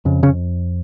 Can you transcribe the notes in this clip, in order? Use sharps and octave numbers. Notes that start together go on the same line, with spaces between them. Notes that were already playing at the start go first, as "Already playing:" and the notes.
F2 C#3
C#3 C#4